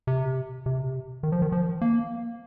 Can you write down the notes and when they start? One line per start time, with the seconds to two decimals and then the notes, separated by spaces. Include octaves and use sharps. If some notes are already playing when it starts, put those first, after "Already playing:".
0.07 C3
0.66 C3
1.23 D#3
1.32 F3
1.42 D#3
1.52 F3
1.81 A#3